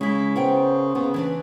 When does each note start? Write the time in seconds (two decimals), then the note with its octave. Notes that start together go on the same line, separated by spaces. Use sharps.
0.01 C#3 G#3 E4 B6
0.36 B3 A#4 C5 G5
0.95 C#3 B3
1.14 E3 D4 B4